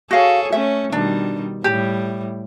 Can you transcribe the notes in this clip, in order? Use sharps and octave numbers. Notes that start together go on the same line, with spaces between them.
F#4 G#4 A4 C#5 F5
A3 C#4 E5
B2 D#3 G3 D4
A2 G3 G4